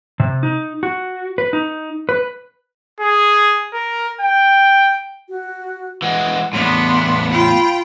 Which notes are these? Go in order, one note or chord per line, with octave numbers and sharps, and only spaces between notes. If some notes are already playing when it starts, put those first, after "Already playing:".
C3
D#4
F#4
B4
D#4
B4
G#4
A#4
G5
F#4
E3 G#3 F#5
E2 A2 B3 D4 C6
F4 G5 B5